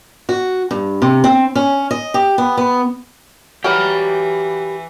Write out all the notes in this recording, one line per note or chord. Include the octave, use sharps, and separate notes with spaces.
F#4
G2
C3
C4
C#4
D#5
G4
B3
B3
E3 F#3 G4 A#4 B5